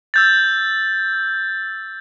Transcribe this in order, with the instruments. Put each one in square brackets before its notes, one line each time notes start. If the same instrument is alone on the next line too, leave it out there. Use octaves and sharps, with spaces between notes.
[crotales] E6 G6 A6